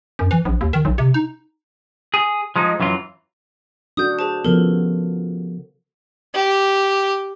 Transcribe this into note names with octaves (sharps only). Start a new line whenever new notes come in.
F#2
E3
A#1
D#2
D#3
B1
C3
D#4
G#4
F3 G#3 D#4
F#2 E3 F#3 F4
D4 F#4 A4 D#6 G6
G#4 C5 A5
C#3 F3 B3 A4 A#4
G4